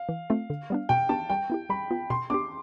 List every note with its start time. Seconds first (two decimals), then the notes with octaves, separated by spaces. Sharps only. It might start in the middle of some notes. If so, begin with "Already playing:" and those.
Already playing: F5
0.09 E3
0.30 A3 C4 F4 A4
0.50 D3
0.70 G3 B3 D4
0.89 B2 G5
1.09 B3 D4 G4 A5
1.30 G3 G5
1.50 B3 E4 G4
1.69 G3 B5
1.91 B3 F4
2.10 B2 C6
2.30 B3 D4 G4 D6